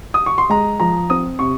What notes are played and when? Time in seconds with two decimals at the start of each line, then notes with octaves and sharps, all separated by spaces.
0.14 D#6
0.26 C#6
0.38 C6
0.49 G#3 A#5
0.80 F3 A#5
1.10 C4 D#6
1.39 C3 C#6